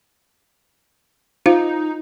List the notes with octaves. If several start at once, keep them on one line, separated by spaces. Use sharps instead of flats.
D#4 F4 C5 F5